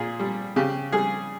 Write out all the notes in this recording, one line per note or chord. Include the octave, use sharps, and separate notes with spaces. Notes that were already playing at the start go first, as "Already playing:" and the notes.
Already playing: A#2 G#4
G3
C#3 G4
G3 G#4